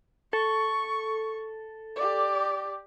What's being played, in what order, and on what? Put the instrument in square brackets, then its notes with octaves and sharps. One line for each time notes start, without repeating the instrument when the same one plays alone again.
[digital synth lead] A4 [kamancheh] C#6
[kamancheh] G4 D5